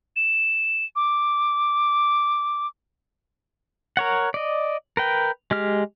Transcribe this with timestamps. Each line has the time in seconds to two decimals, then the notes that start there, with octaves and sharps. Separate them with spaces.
0.16 E7
0.96 D6
3.97 A#4 C#5 F#5
4.34 D5 D#5
4.97 A#4 B4 G5
5.51 G#3 G4 F6